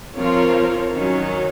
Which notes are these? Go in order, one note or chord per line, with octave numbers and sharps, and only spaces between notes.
F3 C4 F4 A#4 C#5
D#3 F#3 C#4